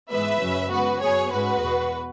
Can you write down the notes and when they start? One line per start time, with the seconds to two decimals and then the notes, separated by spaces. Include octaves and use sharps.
0.10 G#2 E3 G#3 B3 B4 E5
0.41 F#2 C#3 F#3 C#4
0.71 C#3 G#3 B3 F#4 B4
1.01 F#2 F#3 B3 G#4 C#5
1.31 G#2 G#3 C#4 F#4 B4
1.62 E2 B2 B3